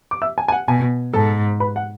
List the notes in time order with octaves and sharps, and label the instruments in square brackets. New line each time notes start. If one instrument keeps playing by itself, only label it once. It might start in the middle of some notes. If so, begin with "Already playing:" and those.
[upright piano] D6
E5 E6
G#5
G#5
F#5
[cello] B2 [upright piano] G#5
[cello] G#2 [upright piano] A4 A5
[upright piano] B4 B5
F#5